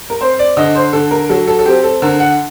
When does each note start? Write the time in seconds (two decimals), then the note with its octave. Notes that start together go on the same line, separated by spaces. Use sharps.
0.10 A#4
0.21 C4 C5
0.39 D5
0.57 D3 D#5
0.75 C5
0.93 D3 A4
1.11 A#4
1.29 F#3 A4
1.47 A4
1.59 A4
1.66 C4 G4
1.83 A4
2.02 D3 A#4
2.20 F#5